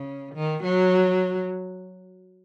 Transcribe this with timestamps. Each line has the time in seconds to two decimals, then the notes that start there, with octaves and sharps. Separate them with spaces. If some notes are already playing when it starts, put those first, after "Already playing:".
Already playing: C#3
0.35 D#3
0.63 F#3